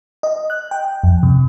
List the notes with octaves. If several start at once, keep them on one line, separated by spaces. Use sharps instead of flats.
D#5
F#6
G5
F2
C3